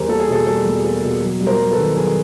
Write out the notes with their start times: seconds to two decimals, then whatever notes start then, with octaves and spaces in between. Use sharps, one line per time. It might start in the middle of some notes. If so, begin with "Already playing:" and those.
Already playing: E2 G3 A#4 C5
0.09 A#3 A4
0.20 G#4
0.28 B2 A4
0.47 G3 A4
0.66 E2
0.84 A#3
1.03 B2
1.22 F#3
1.40 G2
1.47 A#4 C5
1.59 G2
1.71 A4 B4
1.78 D#3
1.96 F#3 G#4 A#4